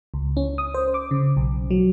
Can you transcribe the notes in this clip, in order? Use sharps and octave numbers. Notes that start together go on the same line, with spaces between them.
C#2
C#4
D#6
C5
D6
C#3
B1
F#3